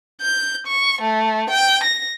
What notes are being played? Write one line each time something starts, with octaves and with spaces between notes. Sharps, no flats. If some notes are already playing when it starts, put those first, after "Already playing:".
G6
C#6
A3
G5
A#6